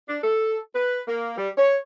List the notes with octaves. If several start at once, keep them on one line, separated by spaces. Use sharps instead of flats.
D4
A4
B4
A#3
G3
C#5